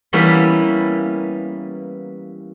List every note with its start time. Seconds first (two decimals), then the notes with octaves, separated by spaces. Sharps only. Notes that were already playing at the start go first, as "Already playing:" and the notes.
0.13 E3 G3 A#3 B3 C#4